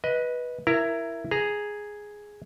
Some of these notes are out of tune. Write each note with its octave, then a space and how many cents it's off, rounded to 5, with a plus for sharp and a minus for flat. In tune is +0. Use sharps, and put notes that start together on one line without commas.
B4 -10 D#5 +15
E4 +15 A#4 +0 A#5 -15
G#4 +0 A#5 +0